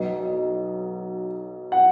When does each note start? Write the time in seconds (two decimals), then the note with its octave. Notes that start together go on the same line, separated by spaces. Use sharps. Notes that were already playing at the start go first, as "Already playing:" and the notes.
Already playing: B1 B2 F#3 D#5
0.20 D#5
1.72 F#5